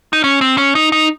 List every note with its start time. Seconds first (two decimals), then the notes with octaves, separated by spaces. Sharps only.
0.13 D#4
0.24 C#4
0.41 C4
0.58 C#4
0.75 D#4
0.92 D#4